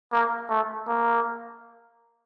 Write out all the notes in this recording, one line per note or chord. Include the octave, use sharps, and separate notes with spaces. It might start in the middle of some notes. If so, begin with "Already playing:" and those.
A#3
A3
A#3